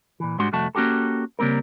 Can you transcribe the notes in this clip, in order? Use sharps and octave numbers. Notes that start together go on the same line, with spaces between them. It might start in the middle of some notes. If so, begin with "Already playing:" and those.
A#2 E3
G#2 G3 G#3 D4 F#4 C6
C2 F2 A3 F#4 A5
A#3 C#4 F#4 G4 A4
C#3 G3 A#3 C4 A#4